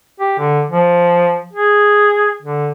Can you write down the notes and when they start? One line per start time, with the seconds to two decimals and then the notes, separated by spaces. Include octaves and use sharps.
0.20 G4
0.39 D3
0.71 F3
1.53 G#4
2.42 D3